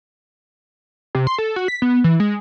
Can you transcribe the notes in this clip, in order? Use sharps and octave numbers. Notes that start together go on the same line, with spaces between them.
C3
C6
A4
F#4
B6
B3
E3
G#3